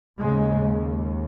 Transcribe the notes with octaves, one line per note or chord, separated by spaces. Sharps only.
D#2 G#2 C#3 G#3